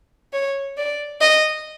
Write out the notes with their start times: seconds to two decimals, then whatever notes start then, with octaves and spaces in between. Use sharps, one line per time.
0.33 C#5
0.77 D5
1.21 D#5